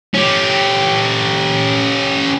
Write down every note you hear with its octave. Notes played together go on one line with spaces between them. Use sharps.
C#4 G4